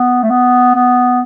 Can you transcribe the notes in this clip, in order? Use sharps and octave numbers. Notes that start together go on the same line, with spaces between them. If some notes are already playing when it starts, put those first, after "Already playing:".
Already playing: B3
A3
B3
B3